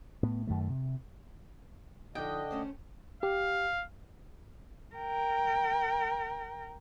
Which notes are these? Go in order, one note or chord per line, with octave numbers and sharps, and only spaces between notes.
A2 B3
F#2 D#3 A3
C3
D3 F3 D4 D#4 D#5 G5
A3 C#4 C5
G4 F5
A#4 G5